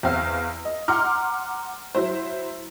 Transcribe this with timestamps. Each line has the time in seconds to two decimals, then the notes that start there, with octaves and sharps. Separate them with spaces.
0.03 E2 C4 F5 E6
0.65 D#5
0.88 F#5 A#5 C6 D6 F6
1.95 F#3 E4 C5